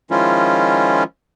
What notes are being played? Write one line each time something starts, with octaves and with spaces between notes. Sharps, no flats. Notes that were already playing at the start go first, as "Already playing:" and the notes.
D#3 F3 G#3 C#4 E4 F4